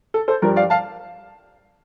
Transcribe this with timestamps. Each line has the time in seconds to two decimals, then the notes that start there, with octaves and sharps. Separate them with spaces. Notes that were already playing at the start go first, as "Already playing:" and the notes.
0.14 A4
0.28 A4 C5
0.42 G2 F3 A#4 D5
0.56 D5 F5
0.70 F5 A5